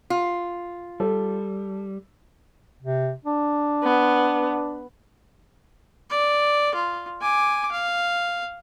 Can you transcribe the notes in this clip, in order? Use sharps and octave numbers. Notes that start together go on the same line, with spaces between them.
F4
G3 A4
C3
D4
B3
D5
F4
G#5 D6
F5